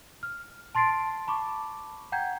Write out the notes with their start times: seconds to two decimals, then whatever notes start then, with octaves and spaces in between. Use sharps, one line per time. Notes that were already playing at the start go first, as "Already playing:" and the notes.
0.23 F6
0.75 A5 C6 A6 C7 D7
1.27 A5 B5 C#6 D6
2.12 F#5 G5 A#5 G6 G#6